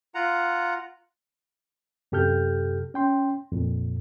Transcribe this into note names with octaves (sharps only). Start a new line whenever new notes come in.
F4 F#5 A#5
F#2 C3 G4 A4 F6 G6
C#4 G5 C6
F2 A#2